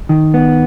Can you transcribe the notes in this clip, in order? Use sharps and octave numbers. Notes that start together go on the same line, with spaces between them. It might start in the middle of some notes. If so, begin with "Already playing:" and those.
D#3
B3